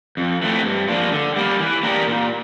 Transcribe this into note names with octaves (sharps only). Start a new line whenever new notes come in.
F2
E3 A3 C4
G2
F3 A#3 D4 F4
D3
G3 A#3
E3
A#3 D4 G4 A#4
A#2